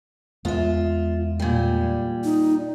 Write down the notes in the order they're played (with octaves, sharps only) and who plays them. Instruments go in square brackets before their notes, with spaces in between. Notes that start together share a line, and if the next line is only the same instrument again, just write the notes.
[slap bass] E2 G#3 B3 [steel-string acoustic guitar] F4 E5
[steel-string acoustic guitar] A#2 G3
[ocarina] D#4